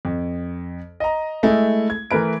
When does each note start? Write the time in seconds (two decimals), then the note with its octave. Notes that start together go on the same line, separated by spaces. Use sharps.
0.05 F2
1.00 D#5 A#5
1.43 G#3 A3 E4
1.90 G#6
2.11 E3 A3 A#4 B4 D7